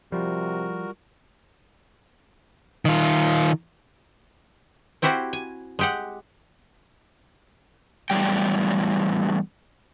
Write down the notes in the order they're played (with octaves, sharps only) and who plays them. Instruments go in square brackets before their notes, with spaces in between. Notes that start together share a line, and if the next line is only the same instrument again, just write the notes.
[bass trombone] C3 [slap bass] F3 [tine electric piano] G3 F4 [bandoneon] F#4 A#4
[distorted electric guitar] D#3 F4
[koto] C4 E4 F#4 G4 C5
G#5
G#3 G4 F#5
[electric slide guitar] E2 A2 C3 F#3 G3 G5